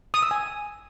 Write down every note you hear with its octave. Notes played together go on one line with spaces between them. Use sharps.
D#6
E6
G#5